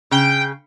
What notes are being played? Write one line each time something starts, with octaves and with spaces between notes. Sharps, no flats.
C#3 G5